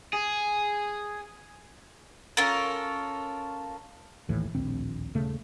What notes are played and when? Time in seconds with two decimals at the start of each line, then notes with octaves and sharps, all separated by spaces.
0.13 G#4
2.37 C#4 F4 A4 A#4
4.29 A#1 D#2 A2 E3
4.55 D1 A#1 D#2 C4
5.15 D#1 C#3 A3